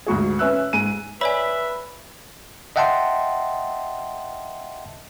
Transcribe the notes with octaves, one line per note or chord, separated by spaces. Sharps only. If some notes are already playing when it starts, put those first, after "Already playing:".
D2 G#2 F#4 G#4
C#4 B4 E5 E6 F#6
G#2 G#5 D#7
B4 C#5 D5 E5 G#5 B5
D#5 E5 F#5 G5 A5 C6